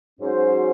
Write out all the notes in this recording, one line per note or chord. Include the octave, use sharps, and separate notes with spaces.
G#2 F#3 C#4 F#4 C5